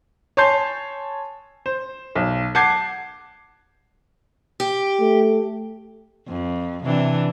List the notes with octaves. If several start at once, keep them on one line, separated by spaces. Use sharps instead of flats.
C#5 G#5 A5 C6 G6 C7
C5
B1
F#5 A5 D6 G6 G#6 C7
G4
A3
F2
C3 E3 D4